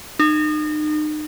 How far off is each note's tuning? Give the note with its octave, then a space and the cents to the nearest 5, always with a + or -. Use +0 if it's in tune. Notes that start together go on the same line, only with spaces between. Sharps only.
D#4 -35